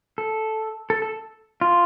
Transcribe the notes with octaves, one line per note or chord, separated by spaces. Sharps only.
A4
A4
A4
F4